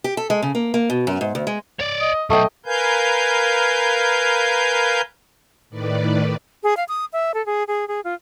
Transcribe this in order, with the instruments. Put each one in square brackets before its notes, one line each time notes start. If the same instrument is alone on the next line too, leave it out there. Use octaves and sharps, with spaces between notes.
[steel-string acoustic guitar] G4
A4
G#3
C#3
A#3
A#3
B2
F#2
G#2
D2
G#3
[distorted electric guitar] C#5 D5
[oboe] D#5
[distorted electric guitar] F#3 B3 [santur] A3 G5 [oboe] D#5
[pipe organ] A#4 B4 F5 G#5 G6
[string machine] A2 D#3 B4 D5
[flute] G#4
F5
D#6
E5
A4
G#4
G#4
G#4
F4